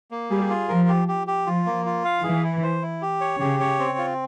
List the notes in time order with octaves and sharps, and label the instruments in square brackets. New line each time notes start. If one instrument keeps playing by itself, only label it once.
[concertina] A#3
[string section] G3 [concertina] G#4
[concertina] F4
[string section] F3 [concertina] A#4
[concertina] G4
G4
G4
[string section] F3 [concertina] F4
[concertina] A#3
F4
F5
[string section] E3 [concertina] G#4
[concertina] E4
C5
E4
G4
C#5
[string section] C#3 [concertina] G4
[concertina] C#5
C4
F4